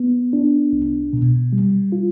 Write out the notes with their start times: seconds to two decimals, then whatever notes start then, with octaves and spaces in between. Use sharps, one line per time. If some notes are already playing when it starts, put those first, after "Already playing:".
Already playing: B3
0.33 D4
0.73 C2
1.13 B2
1.53 G3
1.92 F4